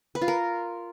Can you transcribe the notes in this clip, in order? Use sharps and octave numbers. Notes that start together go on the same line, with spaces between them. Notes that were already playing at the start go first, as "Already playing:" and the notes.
B4
F4
A#4